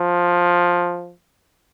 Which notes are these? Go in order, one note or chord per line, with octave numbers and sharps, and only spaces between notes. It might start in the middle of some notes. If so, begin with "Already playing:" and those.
Already playing: F3